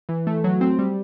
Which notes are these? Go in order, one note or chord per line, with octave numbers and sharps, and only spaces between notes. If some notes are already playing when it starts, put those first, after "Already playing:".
E3
A3
F#3
C4
G3